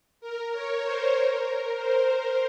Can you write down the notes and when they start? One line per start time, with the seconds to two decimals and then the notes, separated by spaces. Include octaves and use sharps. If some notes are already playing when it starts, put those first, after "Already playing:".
0.20 A#4
0.52 C#5
0.83 C5
1.15 A#4
1.77 C5